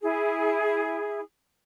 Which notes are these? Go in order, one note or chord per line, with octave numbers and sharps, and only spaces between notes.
E4 G#4